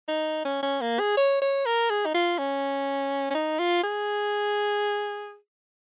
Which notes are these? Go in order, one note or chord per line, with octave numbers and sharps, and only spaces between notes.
D#4
C#4
C#4
A#3
G#4
C#5
C#5
A#4
G#4
D#4
F4
C#4
C#4
D#4
F4
G#4